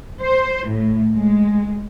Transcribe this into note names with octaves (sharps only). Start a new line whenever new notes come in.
C5
A2
G#3